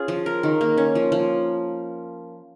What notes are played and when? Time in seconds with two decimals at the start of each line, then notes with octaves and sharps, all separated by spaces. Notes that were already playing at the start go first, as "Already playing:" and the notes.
Already playing: C#4 F4 G#4
0.08 F3
0.26 A#4
0.43 D#3
0.61 A#3
0.77 C#4
0.95 F3
1.12 F3